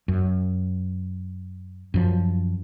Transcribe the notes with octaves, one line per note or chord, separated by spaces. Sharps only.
F#2
F#2 F3